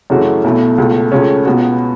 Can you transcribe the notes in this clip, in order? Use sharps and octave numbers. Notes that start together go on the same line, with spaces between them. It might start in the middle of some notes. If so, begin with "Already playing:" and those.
F#2 C#3 E3 A3 F#4
B1 B2 A3 E4
C#2 B2 A3
C#2 C#3 A3 C#4
C#2 B2 B3 F#4